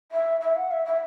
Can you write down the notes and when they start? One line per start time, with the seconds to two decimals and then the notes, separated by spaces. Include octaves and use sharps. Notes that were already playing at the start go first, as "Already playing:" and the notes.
0.12 E5
0.41 E5
0.56 F#5
0.71 E5
0.86 E5